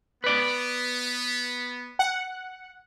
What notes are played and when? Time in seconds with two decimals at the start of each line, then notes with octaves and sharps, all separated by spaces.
0.24 B3 B4 D5
1.99 F#5